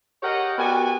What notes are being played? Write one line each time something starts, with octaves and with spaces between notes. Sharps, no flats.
G4 G#4 A#4 C#5 D#5 F#5
B3 F#4 G4 A#4 D5 G#5